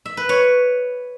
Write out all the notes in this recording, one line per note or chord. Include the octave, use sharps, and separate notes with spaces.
E5
B4
C#5